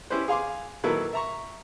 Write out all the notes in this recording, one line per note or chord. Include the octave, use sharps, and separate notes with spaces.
C#4 E4 G4 B4 C5
G#4 F5 C6 D6
D#3 F#3 A#3 E4 A4 B4
E5 A#5 C#6